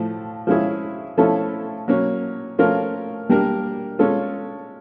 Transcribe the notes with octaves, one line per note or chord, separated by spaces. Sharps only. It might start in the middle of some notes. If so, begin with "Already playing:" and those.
Already playing: A2 F3 A3
F3 G#3 C#4 E4 G#4
F3 A3 C#4 E4 A4
F#3 A#3 C#4
F3 A3 C#4 F4 A#4
G3 A#3 D4 G4 A#4
G#3 C#4 F4 A4